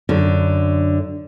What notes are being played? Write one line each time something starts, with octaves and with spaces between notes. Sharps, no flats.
F#2 D3